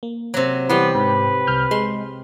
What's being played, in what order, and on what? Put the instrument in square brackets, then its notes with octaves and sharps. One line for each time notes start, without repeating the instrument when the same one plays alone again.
[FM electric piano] A#3
[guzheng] C3 F#3
[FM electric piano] E3 G3 [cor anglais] B3 [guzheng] G4 C6
[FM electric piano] G#2 [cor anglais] B4
[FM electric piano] C2 F6 G6
[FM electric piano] G#3 [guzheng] C6